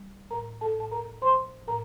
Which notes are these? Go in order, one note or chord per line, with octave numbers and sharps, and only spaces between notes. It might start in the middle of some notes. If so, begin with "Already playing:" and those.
Already playing: G3
A2 A#4 A#5
A4 A5
A2 A5
A#4 A#5
F3 C5 C6
A2 A#4 A#5